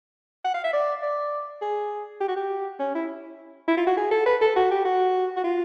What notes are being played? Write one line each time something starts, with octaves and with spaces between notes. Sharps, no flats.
F#5
F5
E5
D5
D5
G#4
G4
F#4
G4
C#4
E4
E4
F4
F#4
G#4
A4
B4
A4
F#4
G4
F#4
F#4
F4